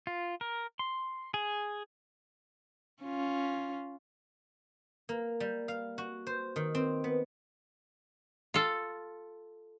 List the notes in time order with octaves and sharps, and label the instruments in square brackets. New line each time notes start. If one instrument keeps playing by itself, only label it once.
[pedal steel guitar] F4
A#4
C6
G#4
[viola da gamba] C#4 F4
[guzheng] A#3
G3
F5
F#4
C5
D#3
C4
B3
[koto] F4 A4